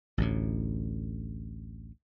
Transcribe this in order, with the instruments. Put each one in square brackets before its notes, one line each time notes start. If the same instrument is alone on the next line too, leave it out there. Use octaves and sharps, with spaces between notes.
[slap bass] A1 D2 A2